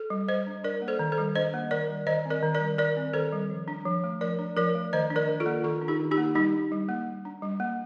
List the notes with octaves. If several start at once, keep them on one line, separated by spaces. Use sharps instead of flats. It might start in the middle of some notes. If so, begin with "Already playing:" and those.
Already playing: A4
G3
G3 C5 D#5
D4
D4 A#4 D5
A#3
A4 C5
D#3
A4 C5
G3
D4 C5 D#5
A#3
D#3 A#4 D5
G3
D#3 C5 D#5
C4
A#4 D5
D#3
A#4 D5
G3
D#3 A#4 D5
C4
D#3 A4 C5
G3
F3
D4
F3
A3
F3 A#4 D5
D4
F3 A#4 D5
A3
D#3 C5 D#5
D4
A#4 D5
D#3
F4 A4
A#3
D#3 F4 A4
D4
D#4 G4
D#3
D#4 G4
A#3
G3 D#4 G4
D4
G3
A#3
G3
D4
G3
A#3